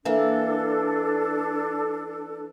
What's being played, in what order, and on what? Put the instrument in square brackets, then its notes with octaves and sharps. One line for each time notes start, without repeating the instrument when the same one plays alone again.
[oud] E3 A#3 [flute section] D4 A4